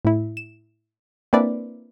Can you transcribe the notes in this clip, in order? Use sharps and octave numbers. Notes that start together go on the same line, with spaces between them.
A2 E4
E7
A#3 C4 D4 E4 B4 D5